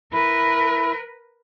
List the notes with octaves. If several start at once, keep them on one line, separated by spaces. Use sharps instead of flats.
E4 A#4 B4